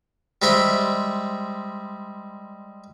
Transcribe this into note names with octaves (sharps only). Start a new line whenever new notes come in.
G3 G#3 C5 E5